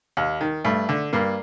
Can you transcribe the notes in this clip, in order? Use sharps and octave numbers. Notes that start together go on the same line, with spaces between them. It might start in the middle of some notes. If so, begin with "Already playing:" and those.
D#2
D#3
G2 A3
D3
G2 A#3